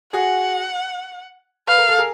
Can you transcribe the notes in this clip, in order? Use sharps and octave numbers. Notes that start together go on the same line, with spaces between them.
F#4 G#4 F#5
B4 F5
A#4
A4
G#4 A#4